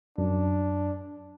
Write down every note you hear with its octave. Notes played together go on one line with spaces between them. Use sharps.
F#2 D4